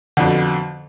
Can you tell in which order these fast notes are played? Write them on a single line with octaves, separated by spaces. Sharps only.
D3 F2 B2